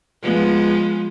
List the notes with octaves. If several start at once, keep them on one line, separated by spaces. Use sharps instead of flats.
F3 G#3 B3